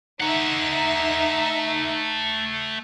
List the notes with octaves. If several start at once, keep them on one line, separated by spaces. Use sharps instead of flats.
A3 D#4 E5 F#5